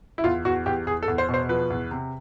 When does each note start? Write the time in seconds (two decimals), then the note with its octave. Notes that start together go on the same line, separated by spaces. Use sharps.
0.18 E4
0.24 E2 F4
0.45 E2 F#4
0.66 E2 G4
0.87 E2 G#4
1.03 A4
1.08 E2
1.18 C5
1.29 B2
1.34 C5
1.49 F3 B4
1.70 E2
1.91 C3